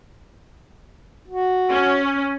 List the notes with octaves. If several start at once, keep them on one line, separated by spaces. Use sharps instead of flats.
F#4
C#4